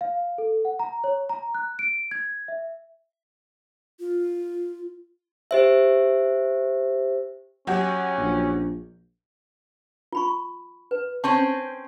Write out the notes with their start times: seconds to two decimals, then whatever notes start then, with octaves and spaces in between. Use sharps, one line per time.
0.01 F5
0.38 A4
0.65 F#5
0.79 A#5
1.04 C#5
1.29 A#5
1.55 F#6
1.79 D7
2.11 G#6
2.48 E5
4.00 F4
5.51 G4 C5 E5
7.67 F#3 C#4 F#4 G4
8.18 A#1
10.12 F4 B5 C#6
10.91 B4
11.24 C4 C#4 C5 A5